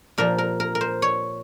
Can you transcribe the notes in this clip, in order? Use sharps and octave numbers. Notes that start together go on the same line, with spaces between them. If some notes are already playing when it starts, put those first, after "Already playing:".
A#2 F3 A#4
A#4
A#4
A#4
C5
C#5